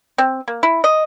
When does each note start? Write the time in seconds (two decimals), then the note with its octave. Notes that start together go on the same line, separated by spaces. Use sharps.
0.18 C4
0.48 A#3
0.63 E4
0.84 D#5